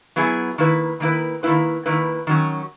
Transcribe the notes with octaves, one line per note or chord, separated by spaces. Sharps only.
F#3 B3 E4 G#4
D#3 A#3 E4 B4
D#3 A#3 E4 B4
D#3 A#3 E4 B4
D#3 A#3 E4 B4
D#3 F#3 C#4